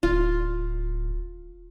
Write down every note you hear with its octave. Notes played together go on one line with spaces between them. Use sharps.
D1 F4